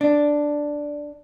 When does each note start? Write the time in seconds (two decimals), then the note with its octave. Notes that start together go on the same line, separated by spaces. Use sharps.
0.01 D4